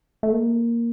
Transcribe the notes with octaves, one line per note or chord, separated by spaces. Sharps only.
A3
A#3